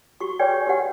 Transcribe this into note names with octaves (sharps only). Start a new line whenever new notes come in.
F#4 G4 C#6
G#4 B4 C#5 D5 G5 G#5
G4 B4 F#5